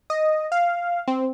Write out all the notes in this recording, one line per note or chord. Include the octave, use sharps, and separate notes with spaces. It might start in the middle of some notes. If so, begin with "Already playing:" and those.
D#5
F5
C4